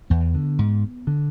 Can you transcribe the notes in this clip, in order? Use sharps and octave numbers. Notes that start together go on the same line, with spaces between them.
E2 B3
D3
G#2
D3